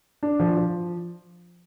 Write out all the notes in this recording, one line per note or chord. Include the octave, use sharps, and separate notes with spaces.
D4
F3
F3